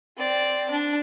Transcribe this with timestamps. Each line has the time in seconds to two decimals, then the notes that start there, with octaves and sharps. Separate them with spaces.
0.18 C4 D5
0.71 D4